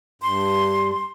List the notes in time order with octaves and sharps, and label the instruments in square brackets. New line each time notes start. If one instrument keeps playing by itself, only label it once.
[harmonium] G2 [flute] C6